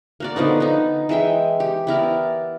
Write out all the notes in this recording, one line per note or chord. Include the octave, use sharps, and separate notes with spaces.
A#3 F#4 D5
D3 F3 B3 D#4
B3 D#4
E3 G#3 E5 G5
G4
B3 E4 A#4 D5